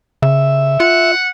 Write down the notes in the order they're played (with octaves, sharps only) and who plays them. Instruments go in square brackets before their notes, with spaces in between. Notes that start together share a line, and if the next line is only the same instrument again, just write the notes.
[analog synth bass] C#3 [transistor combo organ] E5
[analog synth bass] F4 [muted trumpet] F#5